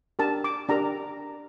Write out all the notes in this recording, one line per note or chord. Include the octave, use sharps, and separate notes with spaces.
D4 G4 A#4 A5
D6
D4 G4 A#4 A#5